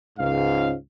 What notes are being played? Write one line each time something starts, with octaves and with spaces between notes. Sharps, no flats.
C#2 G#2 F5